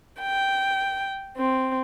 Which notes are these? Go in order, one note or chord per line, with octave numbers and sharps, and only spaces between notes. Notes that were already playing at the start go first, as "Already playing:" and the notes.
G5
C4